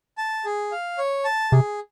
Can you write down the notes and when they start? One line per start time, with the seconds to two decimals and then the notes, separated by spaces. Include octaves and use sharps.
0.18 A5
0.45 G#4
0.72 F5
0.98 C#5
1.25 A5
1.52 C3 G#4